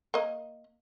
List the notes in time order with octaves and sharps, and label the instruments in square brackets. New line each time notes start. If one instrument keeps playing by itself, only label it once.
[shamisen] A#3 D#5